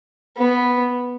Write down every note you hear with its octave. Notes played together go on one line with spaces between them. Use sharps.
B3